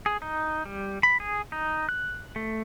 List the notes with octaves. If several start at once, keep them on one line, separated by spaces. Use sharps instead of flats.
G#4
D#4
G3
B5
G#4
D#4
F#6
A3